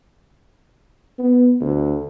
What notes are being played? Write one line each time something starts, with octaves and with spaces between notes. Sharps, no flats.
B3
D2